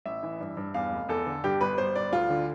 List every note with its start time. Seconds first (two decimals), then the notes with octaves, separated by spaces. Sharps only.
0.06 A1 E5
0.23 E3
0.40 G2
0.57 G2
0.74 E2 F5
0.92 F1
1.09 E2 A4
1.27 D3
1.44 G2 G4
1.61 G1 B4
1.78 G1 C5
1.95 G1 D5
2.12 D2 F4
2.30 D3